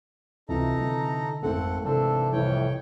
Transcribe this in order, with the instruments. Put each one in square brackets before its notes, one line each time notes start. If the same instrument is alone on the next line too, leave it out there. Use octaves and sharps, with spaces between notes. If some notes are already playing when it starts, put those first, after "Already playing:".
[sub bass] C#2 [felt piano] C3 E3 F4 [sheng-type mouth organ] D#4 A4 A#5
[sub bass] D3
[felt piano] G#1 A3 [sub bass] F2 [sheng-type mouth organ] C4 A4 F#5
[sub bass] C3 [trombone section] E3 A4 [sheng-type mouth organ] C4 D4
[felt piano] C2 E3 [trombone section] F2 A2 [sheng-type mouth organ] C#5 G5